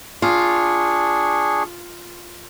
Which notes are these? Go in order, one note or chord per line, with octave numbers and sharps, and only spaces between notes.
D4 F4 G#4 C#6